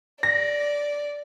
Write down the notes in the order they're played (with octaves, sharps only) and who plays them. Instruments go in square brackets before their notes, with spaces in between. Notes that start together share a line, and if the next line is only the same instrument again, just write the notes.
[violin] D5 [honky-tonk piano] A#6